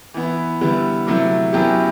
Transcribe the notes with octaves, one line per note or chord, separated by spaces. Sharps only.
E3 B3 E4
D3 G3 B3 E4 B4
C3 F#3 A3 E4 A4
F#2 F#3 B3 E4 G4